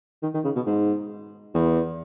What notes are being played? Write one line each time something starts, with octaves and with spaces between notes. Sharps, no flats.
D#3
D#3
C#3
B2
G#2
E2